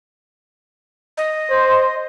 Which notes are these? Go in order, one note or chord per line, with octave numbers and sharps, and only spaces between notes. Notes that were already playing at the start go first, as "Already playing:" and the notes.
D#5
C5